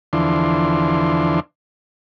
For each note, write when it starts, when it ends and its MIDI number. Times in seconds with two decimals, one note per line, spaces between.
0.13 1.40 40
0.13 1.40 50
0.13 1.40 52
0.13 1.40 53
0.13 1.40 62
0.13 1.40 84